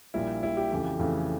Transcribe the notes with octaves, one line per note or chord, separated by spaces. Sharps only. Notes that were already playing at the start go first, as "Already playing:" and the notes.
A#1 A#2 G3 E4
A#1 A#2 G3 E4
G4
F2 C#3 E3 A3
F2 C#3 E3 A3